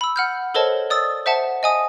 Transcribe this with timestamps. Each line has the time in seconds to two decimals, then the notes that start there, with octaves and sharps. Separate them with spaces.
0.01 B5 E6
0.16 F#5 F6 G6
0.54 A4 A#4 C5 C#5 D#5 A5
0.90 D5 D#6 E6 A6
1.26 C5 E5 F#5 A5
1.63 D#5 G#5 D#6